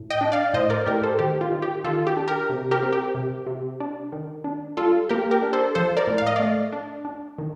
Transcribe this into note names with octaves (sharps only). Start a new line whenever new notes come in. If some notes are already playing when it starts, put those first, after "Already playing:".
Already playing: A2
D#5 G5
D4
D5 F5
A2 C5 D#5
A#4 D5
A2 G4 A#4
A4 C5
D#3 G4
F4
D#3
G4
D#3 F4 A4
G4
D4
G4 A#4
C3
G4 A#4
C4
G4
C3
C3
D4
D#3
D4
G3 F4 A4
A#3 G4 A#4
G4 A#4
D4
A4 C5
F3 A4 C5
A#4 D5
A2
F5
D#5
A3 D5 F5
D4
D4
D#3